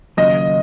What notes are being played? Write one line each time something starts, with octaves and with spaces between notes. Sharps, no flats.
D#2 C#3 F#3 A#3 D#5